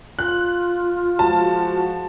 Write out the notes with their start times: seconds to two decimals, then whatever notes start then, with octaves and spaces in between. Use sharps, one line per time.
0.19 F4 F#6
1.19 F3 G#3 F#4 A5